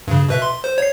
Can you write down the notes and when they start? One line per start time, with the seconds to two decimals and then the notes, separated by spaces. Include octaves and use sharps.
0.08 G2 C#3
0.29 B2 B4 E5
0.42 C6
0.64 C5
0.78 C#5 C7